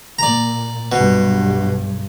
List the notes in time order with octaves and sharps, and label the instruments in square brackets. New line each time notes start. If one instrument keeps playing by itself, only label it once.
[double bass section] A#2 [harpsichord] D5 A#5
[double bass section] B1 G2 [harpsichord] B2